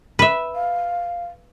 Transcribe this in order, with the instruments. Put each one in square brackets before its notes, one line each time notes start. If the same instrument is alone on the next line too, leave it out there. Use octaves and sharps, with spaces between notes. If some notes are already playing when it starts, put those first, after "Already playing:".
[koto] B4 E5
[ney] F5